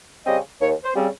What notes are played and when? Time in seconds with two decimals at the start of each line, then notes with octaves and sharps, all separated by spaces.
0.26 C#3 G3 C4 D#5
0.60 D#2 C#5
0.84 C5
0.95 C#3 G3 C4